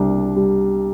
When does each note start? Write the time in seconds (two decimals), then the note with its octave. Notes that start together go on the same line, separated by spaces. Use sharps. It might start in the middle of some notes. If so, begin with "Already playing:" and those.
Already playing: C2 G3 D4
0.36 G3